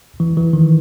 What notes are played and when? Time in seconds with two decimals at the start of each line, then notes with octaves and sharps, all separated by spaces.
0.20 E3
0.37 E3
0.53 D#3